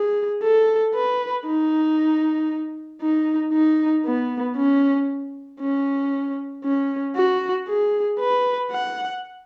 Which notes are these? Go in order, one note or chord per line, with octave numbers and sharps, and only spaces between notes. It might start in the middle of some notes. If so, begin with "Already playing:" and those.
Already playing: G#4
A4
B4
D#4
D#4
D#4
B3
C#4
C#4
C#4
F#4
G#4
B4
F#5